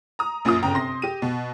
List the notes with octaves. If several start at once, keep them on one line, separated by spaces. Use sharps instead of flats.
A#5 D#6
A#1 F#2 A#2 F4 D#6
G1 C#3 G5 A#5
C3 C6 A#6
G4 D#7
B2